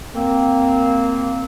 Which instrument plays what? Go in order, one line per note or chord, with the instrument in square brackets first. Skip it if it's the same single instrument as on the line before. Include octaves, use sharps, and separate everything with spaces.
[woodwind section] A#3 C4